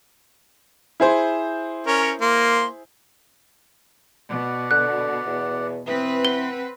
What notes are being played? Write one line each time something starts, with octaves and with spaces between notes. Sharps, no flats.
E4 G#4 C5
C#4 A#4 C#5
A#3 C6
B2 D5 F#5
D3 F#6
E2
E3 C4 B4 D#6
F#5 G7